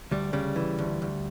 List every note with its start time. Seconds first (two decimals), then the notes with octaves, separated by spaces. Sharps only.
0.11 D2 G3
0.33 C#3 G3
0.56 E3
0.78 D2
1.02 D2